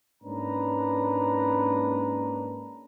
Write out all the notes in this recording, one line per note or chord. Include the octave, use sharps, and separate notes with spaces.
G#2 A#3 C#4 D4 B4 A#5